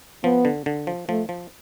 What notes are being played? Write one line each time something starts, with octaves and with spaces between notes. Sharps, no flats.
F3 B3
D3
D3
F3
F3 A3
F3